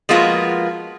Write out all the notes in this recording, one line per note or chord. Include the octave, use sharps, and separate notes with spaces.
F3 G#3 A#3 B3 F4 F#4